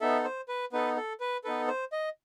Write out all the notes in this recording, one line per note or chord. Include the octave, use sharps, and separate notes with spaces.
B3 D#4 A4 E5
C5
B4
B3 D#4 A4 B4
A4
B4
B3 D#4 A4 B4
C5
D#5